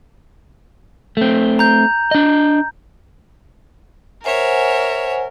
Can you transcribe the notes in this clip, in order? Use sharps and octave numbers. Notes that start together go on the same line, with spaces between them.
A3 C4
A#5 G6
D4 D#5
A#4 C5 C#5 E5 F#5 G#5